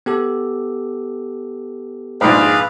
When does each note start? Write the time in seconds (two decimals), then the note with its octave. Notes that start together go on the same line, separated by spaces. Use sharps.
0.06 B3 G4 A4
2.21 A#1 G#2 G#4 B4 F5